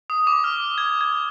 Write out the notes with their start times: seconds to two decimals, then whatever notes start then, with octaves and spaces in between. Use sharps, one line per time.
0.10 D#6
0.27 D6
0.44 F6
0.78 G#6
1.01 G#6